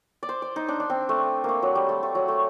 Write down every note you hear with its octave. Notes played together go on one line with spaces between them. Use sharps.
D5
C5
D5
D#4
D4
D4
C4
A3
A3 A#3
F#3
G3
A3
A3
F#3
A3